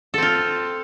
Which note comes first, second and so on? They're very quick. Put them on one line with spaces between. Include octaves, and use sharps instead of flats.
A4 C4 F4